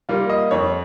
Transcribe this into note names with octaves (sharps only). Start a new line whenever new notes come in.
G3 A#3 F4
D#5
F2 C#5